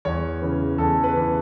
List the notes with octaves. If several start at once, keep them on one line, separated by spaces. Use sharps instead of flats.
E2 C#5
C#3 E3
E2 A4
B4
C#3 E3